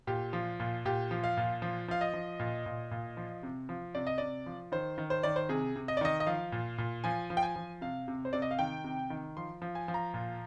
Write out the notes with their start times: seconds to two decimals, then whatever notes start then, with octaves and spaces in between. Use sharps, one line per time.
0.07 A#2 G4
0.33 F3
0.60 A#2
0.85 A#2 G4
1.11 F3
1.24 F5
1.37 A#2
1.62 F3
1.88 F3 F5
2.01 D#5
2.14 F3
2.40 A#2
2.66 A#2
2.91 A#2
3.17 F3
3.43 C3
3.69 F3
3.95 C3 D5
4.07 D#5
4.18 C3 D5
4.46 F3
4.72 D#3 C5
4.98 D#3
5.10 C5
5.23 D#3 D5
5.36 C5
5.49 C3 G#4
5.76 C3
5.88 D#5
5.97 D5
6.01 D#3 D#5
6.20 D#5
6.26 F3 F5
6.52 A#2
6.78 A#2
7.04 F3 G#5
7.30 F3
7.37 G5
7.43 G#5
7.56 F3
7.81 C3 F5
8.08 C3
8.25 C5
8.33 C3 D5
8.42 D#5
8.51 F5
8.59 D#3 G5
8.84 C3
9.10 D#3
9.37 F3 C6
9.62 F3
9.75 G#5
9.88 F3
9.94 A#5
10.14 A#2